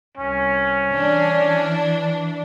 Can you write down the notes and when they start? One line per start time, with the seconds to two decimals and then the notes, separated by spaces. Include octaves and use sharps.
0.18 C2 C#4
0.93 E3 D4